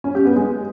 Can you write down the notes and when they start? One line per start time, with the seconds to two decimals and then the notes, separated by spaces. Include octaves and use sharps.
0.04 C#4
0.15 G4
0.25 B3
0.36 G#3